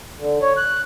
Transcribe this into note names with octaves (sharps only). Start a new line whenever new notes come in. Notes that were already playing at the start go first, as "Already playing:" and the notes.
D3
C#5
F#6